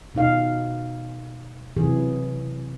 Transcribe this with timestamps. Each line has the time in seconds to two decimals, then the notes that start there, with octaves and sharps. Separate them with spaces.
0.15 B2 D#4 F5
1.77 C3 E3 F#3 G#4